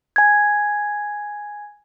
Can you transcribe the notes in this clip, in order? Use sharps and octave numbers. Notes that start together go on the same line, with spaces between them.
G#5 G#6